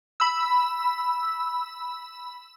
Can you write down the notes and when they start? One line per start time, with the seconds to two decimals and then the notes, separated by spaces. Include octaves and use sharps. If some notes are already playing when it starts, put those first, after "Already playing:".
0.20 B5 E6